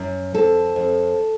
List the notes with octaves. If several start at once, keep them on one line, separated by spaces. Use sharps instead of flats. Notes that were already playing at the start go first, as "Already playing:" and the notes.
Already playing: F#2
F2 A4
F2